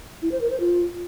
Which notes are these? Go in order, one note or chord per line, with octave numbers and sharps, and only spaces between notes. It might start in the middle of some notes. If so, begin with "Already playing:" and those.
E4
C5
A#4
C5
F4